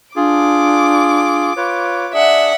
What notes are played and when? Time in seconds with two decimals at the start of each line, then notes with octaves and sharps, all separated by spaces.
0.16 D4 F4 G#4 D6
1.57 F4 B4 C#5
2.13 D4 G#4 D5 E5 F#5